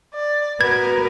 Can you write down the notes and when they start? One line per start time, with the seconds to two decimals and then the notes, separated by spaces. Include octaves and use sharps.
0.14 D5
0.61 B3 F#4 A#4 B4 G#6